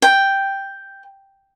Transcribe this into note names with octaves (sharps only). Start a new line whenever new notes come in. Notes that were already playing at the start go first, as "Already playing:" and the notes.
G5